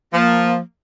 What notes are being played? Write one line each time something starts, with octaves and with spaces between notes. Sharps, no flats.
F3 A#3